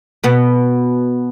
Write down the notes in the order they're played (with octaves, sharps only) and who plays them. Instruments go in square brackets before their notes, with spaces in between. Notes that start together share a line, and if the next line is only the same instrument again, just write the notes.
[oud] B2 B3